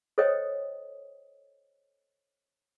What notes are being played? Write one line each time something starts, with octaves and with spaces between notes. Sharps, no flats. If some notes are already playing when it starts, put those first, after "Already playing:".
A4 C5 C#5 D#5 G5 D#6